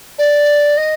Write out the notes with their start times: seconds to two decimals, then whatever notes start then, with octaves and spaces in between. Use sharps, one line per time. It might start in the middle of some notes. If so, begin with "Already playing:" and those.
0.19 D5
0.77 D#5